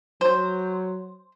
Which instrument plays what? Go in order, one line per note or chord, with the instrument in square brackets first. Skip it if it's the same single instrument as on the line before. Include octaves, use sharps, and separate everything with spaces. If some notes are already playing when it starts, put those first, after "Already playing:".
[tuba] F#3 [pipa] C5